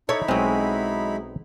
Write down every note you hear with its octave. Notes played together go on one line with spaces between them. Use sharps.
D#4 E4 A4 C#5 B5
B1 F#3 G#3 C4